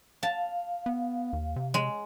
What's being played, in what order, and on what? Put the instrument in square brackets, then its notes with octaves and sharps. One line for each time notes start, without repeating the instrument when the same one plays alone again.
[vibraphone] F5 [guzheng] A5
[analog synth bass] B3
D#2
C3
[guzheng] G#3